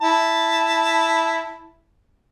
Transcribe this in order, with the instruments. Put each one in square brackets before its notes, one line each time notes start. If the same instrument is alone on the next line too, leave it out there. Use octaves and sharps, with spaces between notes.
[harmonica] E4 A5